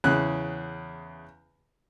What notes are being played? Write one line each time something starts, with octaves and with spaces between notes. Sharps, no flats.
E2 C#3 F#6